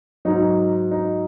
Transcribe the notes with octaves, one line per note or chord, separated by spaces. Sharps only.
G#2 F#3 D#4
D#4